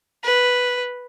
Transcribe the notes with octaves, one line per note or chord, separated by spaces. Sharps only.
B4